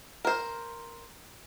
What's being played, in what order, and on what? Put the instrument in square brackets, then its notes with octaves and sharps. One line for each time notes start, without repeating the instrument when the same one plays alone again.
[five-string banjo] A#4 C5